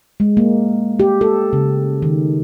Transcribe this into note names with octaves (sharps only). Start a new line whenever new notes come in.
G#3
A#3
G4
A4
C#3
D#3